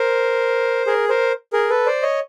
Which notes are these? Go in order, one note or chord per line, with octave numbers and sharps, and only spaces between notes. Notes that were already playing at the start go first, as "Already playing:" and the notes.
Already playing: A#4 C5
G#4 A#4
A#4 C5
G#4 A#4
A4 B4
C5 D5
C#5 D#5